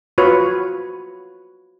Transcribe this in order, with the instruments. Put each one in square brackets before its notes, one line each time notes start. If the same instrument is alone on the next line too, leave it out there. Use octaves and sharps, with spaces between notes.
[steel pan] F4 F#4 B4 C#5